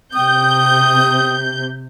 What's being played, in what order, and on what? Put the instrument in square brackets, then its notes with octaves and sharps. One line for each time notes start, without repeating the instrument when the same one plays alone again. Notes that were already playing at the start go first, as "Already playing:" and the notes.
[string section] C3 G6 [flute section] G5 D#6